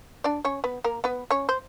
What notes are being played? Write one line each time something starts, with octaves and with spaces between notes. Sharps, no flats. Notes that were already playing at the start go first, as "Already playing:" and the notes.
D4 D5
C#4 C#5
B3 B4
A#3 A#4
B3 B4
C#4 C#5
C5